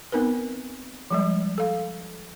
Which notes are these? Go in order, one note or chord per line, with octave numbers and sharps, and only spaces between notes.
B3 C4 D#4 A#4 B4
F3 G3 G#3
A4 F5